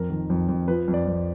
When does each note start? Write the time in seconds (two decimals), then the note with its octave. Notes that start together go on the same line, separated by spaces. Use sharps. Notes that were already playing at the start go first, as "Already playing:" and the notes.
Already playing: F2 A#4
0.10 D#3
0.30 F2
0.48 F2
0.68 F3 B4
0.88 F2
0.94 D5
1.07 F2